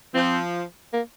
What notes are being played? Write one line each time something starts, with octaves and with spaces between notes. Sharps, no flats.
F3 C4
A#3